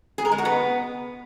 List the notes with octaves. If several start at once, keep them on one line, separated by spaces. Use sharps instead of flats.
G#4
A#4
G#3
F#4
B3